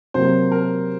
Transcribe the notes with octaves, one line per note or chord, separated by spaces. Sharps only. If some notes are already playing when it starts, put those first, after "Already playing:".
C3 F#3 A#3 C5
A#4